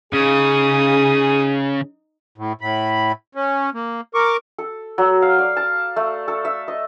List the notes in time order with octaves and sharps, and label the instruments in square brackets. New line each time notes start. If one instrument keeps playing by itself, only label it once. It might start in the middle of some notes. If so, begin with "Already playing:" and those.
[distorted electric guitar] C#3 [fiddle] D#4 D#6 [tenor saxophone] G#4
[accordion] A2
A2 B5
C#4
A#3
A#4 C#6 D6
[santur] A4
F#3
F5
D5
A5
A3
A4
E5
D#5